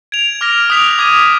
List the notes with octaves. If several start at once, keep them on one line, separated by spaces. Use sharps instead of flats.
G#6 D7 F7
D6 F6 A#6
D#6 F#6 B6 D7 F7
D6 G#6 D#7